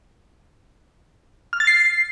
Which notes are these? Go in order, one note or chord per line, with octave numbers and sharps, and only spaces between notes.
F6
A6
C7